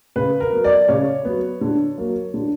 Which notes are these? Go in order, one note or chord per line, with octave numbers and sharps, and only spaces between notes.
C#3 B4
A#4
F#3 B3
D5
C#3 C#5
F#3 B3
D3
F#3 A#3
D3